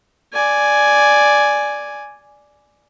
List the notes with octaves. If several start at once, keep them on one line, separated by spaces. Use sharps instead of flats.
D5 G#5